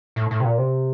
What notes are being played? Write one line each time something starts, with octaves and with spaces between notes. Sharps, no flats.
A2
A2
C3
A#2
C3